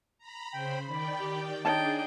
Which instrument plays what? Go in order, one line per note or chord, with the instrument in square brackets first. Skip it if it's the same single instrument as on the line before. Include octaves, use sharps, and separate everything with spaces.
[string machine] A#5 B5
[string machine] C#3 C5 B5 [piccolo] G5
[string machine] D#3 D5 G5 [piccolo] B5
[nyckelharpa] G4
[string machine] D4 G#4 [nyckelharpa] D#4 G5 [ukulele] C#5 A5 [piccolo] A6